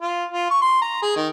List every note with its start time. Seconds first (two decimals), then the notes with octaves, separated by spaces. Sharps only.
0.01 F4
0.30 F4
0.50 C#6
0.62 C6
0.82 A#5
1.02 G#4
1.16 D#3